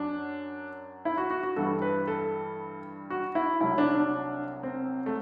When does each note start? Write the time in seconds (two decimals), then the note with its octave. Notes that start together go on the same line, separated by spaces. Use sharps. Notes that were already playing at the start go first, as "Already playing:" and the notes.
Already playing: F#2 F#3 D4
1.05 E4
1.17 F#4
1.30 F#4
1.43 F#4
1.56 G2 E3 G3 A4
1.82 B4
2.08 A4
3.10 F#4
3.35 E4
3.61 C2 C3 F#3 E4
3.78 D4
3.95 D4
4.63 C4
5.06 A3